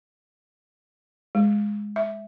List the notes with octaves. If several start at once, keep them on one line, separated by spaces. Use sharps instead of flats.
G#3
E5